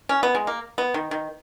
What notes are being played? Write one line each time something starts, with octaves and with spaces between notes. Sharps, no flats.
C#4
B3
G#3
A#3
B3
D#3
D#3